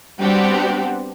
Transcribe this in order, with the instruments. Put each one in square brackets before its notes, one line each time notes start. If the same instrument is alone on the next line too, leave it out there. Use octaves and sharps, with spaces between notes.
[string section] G3 B3 C4 D4 F#4 G4